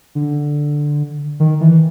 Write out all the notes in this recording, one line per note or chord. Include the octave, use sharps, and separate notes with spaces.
D3
D#3
E3